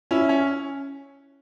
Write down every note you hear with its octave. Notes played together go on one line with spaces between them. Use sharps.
C#4 E4
C#4